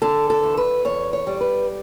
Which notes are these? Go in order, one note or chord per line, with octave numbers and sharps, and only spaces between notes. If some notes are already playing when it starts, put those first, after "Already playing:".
D3 A4
A4
E2
B4
E2 C#5
C#5
G3
B4